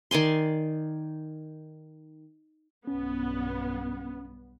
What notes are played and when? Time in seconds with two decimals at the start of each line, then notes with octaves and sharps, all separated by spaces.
0.11 D#3 D5 G#5 C6
2.87 B1 G2 B3 C#4